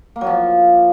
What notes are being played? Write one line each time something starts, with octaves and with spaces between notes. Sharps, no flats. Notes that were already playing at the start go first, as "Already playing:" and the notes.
A#3
F#3
F3